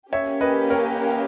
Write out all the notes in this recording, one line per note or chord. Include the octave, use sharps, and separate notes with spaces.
A#3 C#4 G4 C#5 E5
B4 D#5
A#4 C#5